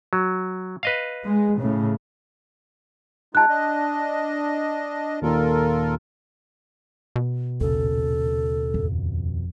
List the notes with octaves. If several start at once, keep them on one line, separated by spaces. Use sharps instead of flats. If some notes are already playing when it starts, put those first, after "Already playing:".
F#3
B4 D#5 F5
G#3
A2 C#3
G#3 D#4 F4 A5 F#6
D4 D#5
D#2 A#2 D#3 F4 A4 A#4
B2
A#1 D#2 C#3 A4
G#1 F2